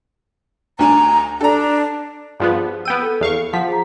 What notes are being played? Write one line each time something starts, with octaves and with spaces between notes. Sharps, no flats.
D2 D4 G#5 A#5
D4 A4 A#5
G2 F3 B3 G#4
B3 G5 E6 D#7
A4
E2 F5 C#6
F3 F#5 B6
G#4 A#5